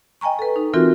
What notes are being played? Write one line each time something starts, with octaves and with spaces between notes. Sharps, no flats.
D#5 G5 G#5 A#5 C#6
A4 B4
D#4
E3 C4 F4 F#4 A#4